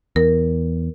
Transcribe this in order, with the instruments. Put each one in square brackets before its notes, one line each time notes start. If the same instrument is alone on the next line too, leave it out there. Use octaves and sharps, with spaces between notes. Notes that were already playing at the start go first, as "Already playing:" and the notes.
[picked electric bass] E2 [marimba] A#4